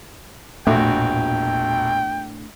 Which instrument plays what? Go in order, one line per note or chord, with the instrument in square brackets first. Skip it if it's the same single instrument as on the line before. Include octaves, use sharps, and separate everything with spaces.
[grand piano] E1 A#1 F#4 [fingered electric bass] A2 D4 [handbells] A3 [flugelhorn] G5